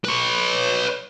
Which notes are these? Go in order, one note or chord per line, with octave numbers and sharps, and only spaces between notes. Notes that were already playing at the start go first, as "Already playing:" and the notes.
B4 C#5